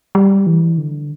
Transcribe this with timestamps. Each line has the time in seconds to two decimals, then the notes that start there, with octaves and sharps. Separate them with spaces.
0.15 G3
0.47 E3
0.78 D3